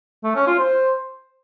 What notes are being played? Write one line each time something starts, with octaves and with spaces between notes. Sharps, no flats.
A3
C#4
F4
C5